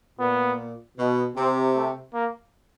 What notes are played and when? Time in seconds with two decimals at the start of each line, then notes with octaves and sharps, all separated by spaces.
0.19 A#2 B3
0.98 B2
1.36 C3 C4
1.75 A3
2.14 A#3